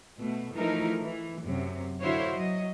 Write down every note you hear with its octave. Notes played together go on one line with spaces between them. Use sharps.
B2 A3
E3 F3 A3 D#4 A#4
E3
F#2 C3
D3 E4 F#4 C5 C#5 F5
F#3 D#5